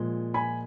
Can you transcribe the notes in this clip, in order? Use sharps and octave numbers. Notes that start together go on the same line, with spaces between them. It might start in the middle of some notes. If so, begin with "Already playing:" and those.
Already playing: A#2 F3 G#3
G#5 B5